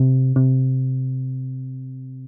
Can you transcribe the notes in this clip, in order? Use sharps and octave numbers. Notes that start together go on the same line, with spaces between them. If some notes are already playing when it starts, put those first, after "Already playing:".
Already playing: C3
C3